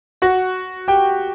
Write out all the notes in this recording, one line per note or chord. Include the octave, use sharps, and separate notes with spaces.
F#4 F#5
G4 G5